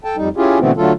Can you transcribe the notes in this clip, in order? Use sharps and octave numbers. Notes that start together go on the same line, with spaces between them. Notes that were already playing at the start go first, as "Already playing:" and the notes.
A4 G5 A5
F2 G3 D#4
C#4 E4 F4 G4 G#4
B2 D3 E3 A3 B3 C4
D3 F#3 A3 F4 A4